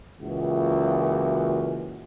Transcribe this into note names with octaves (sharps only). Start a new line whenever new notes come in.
C#2 A#2 E3 F#4